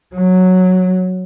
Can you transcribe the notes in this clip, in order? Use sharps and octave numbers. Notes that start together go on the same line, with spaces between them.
F#3